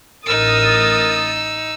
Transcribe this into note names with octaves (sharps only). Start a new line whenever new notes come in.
A1 D#4 A#4 D#6 E6 A6